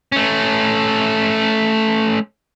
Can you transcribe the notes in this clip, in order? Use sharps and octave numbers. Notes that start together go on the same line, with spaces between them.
A3 C#4